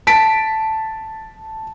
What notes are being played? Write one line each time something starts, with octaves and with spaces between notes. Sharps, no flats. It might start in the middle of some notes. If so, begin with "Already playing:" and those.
A5 B6 D7